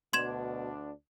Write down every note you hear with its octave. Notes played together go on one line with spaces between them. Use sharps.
D2 B2 D4 C6 G#6 E7